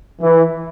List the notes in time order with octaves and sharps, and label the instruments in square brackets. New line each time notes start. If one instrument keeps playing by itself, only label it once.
[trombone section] E3